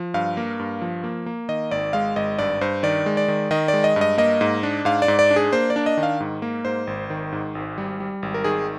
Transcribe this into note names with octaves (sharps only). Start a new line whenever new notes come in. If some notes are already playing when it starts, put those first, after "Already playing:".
Already playing: F3
G2 F5
A#3
G2
F3
A#3
A#3
D#3 D#5
G#1 D5
G#3 F5
G#1 D#5
G2 D5
G2 C5
D#3 D5
G#3
D5
D#3
D#3 D#5
D5
G#3
D#5
G2
D#5
A#3 D#5
G#2
D4
G#2 F5
D5
G#2
D5
D4
G#4
A#3 C5
D5
D4
D#5
D#3
F5
G#2
A#3
G#2 C5
G#1
D#3
G#2
G#1
G3
G3
G#1
A#4
D#3 G#4